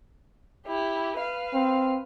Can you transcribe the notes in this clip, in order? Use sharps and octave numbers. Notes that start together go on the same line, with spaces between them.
E4 G4
B4 F5
C4